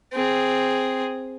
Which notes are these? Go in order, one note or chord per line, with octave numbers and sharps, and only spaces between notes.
C4 G#4